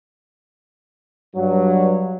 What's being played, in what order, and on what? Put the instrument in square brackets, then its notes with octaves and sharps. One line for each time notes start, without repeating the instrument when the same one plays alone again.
[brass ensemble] G2 F#3